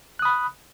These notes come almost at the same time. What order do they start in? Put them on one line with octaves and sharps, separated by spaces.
F#6 D#6 B5